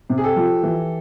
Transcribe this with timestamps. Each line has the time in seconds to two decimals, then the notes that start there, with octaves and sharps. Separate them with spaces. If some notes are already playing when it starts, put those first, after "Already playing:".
0.10 C3
0.18 G#4
0.24 G4 A4
0.36 F3
0.63 E3